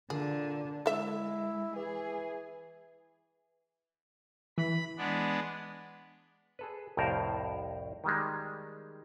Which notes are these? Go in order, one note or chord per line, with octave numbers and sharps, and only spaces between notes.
A#2 D3 G#4
G#3 E4 A4 E5
E3 G#4
E3 B5
G#3 B3 D4
G#4 A4 B4
C2 F2 A2 A#4 C5 F5
D#3 G3 G#3